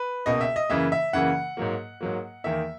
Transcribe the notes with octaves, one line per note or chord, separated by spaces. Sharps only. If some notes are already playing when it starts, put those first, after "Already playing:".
Already playing: B4
C#2 B2 A#3 D#5
E5
D#5
F#2 C#3 E3 A#3 E5
E5
F#2 C#3 E3 A#3 F#5
G#2 F#3 A#3
G#2 F#3 A#3
E2 D#3 A#3 E5